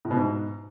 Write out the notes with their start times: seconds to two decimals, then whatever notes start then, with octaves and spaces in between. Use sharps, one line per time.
0.05 A2
0.11 B2
0.17 G#2